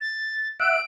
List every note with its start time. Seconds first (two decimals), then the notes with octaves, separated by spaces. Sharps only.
0.01 A6
0.60 E5 F#5 D7